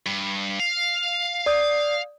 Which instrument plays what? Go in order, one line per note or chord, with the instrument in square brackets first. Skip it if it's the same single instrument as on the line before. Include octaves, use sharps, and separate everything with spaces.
[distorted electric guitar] G2
F5
[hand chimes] D5 D#6 G6